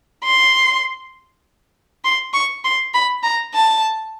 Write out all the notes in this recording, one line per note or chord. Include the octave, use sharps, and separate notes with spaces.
C6
C6
C#6
C6
B5
A#5
A5